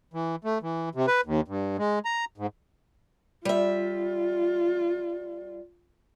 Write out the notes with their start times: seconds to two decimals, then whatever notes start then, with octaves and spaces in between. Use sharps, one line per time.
0.14 E3
0.44 A3
0.62 E3
0.95 C3
1.07 B4
1.25 D#2
1.48 G2
1.78 G#3
2.05 A#5
2.38 G#2
3.45 G3 F4 E5